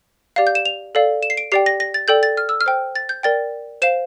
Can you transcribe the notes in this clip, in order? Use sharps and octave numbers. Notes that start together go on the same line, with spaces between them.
G4 D5 F5
G6
E7
F7
A4 D5 F5
E7
C7
D7
G4 D5 G5 C7
A#6
A#6
A6
A4 D5 G5 G6
A6
F6
E6
F6
C5 G5
A6
G6
A#4 D5 G5 A6
C5 F5 E7